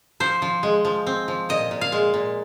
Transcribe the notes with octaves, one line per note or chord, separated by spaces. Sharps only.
F3 C5
F3
G#3
F3
C4
F3
A#2 D#5
A#2
F5
G#3
A#2